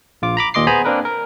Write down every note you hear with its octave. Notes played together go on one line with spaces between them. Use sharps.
A#1 F4 D6
A#5 B5 D6
D#2 A#2 D#5 C6 D6 C7
B3 G#4 C5 G#5 A#5 B5
A#3 C4 D4 A#4 B4
A#4